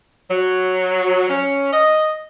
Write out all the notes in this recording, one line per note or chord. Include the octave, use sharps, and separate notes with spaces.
F#3
C#4
D#5